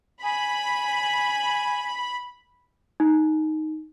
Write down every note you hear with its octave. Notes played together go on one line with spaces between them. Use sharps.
G#5 B5
D#4